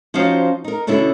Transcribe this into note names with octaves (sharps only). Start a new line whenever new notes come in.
F3 C#4 D#4 F#4 C5 F5
D#4 A#4
B2 D3 C#4 D4 E4